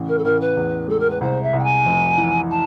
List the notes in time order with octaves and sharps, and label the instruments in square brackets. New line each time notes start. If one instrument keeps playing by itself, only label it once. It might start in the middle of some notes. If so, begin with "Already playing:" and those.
Already playing: [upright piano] A1 C#3
[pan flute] A#4
A4
[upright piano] A1 [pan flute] A#4
[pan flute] B4
[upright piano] E2
[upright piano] G#3 [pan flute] A4
[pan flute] A#4
B4
[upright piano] C2 [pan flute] C5
[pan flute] E5
[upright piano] C2
[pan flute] G5
G#5
[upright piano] F1
E3
[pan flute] A5